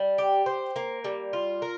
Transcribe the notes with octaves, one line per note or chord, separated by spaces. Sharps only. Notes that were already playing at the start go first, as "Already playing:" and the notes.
Already playing: G3
G4
C5
A#3
G3
F4
A#4